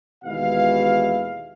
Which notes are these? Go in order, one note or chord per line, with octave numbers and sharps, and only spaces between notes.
D#2 B2 E3 G#3 E4 F5